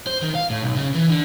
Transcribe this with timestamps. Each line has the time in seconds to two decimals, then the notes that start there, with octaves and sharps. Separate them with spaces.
0.07 C5
0.22 D#3
0.35 F5
0.50 A2
0.63 B1
0.76 C#3
0.94 E3
1.09 D3